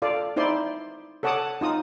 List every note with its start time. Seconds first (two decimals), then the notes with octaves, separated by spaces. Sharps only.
0.02 F4 A4 D5 F5
0.36 D#4 E4 C5 D5 C6
1.23 A4 C#5 F#5 A5 D6 D#6
1.61 D#4 F4 D#6